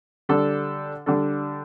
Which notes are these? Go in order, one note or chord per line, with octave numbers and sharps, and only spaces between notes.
D3 G3 D4 A4
D3 G3 D4 A4